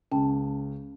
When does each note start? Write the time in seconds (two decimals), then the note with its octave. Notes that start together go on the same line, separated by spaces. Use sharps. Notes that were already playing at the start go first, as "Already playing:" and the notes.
0.12 C#2 C#4 G5 A5